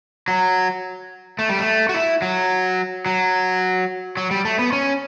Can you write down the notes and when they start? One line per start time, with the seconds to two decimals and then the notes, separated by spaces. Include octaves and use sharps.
0.28 F#3
1.39 A3
1.49 G3
1.59 A3
1.89 F#4
1.94 E4
2.22 F#3
3.06 F#3
4.17 F#3
4.31 G3
4.45 A3
4.59 B3
4.73 C#4